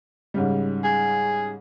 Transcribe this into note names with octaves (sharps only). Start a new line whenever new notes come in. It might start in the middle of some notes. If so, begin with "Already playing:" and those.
G#2 C#3 G3
G#4